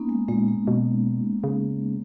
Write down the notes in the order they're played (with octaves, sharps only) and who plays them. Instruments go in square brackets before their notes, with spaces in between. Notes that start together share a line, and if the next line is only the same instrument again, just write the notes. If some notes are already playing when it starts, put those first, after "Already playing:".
Already playing: [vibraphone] A#3 B3 C#4 D#4
G#3
[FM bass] A#2 [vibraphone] G#3
[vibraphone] G#3
[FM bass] B2
C#3